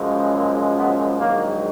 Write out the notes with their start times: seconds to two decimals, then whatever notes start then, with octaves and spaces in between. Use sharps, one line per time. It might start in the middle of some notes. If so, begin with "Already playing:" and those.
Already playing: F#2 C#3 F3 G#3
0.34 A#3
0.76 B3
1.19 A#1 G#2 D#3 F#3 A#3